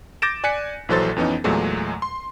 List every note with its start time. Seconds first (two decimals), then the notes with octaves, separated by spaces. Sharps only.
0.22 D6 G6 A6 A#6 D7 E7
0.44 D5 G#5 F#6 B6 C#7
0.89 A#1 E3 F#3 A4 C5 A6
1.16 F2 E3 B3 C#4 D#4
1.44 E2 A#2 F#3 G#3 A3
2.02 C6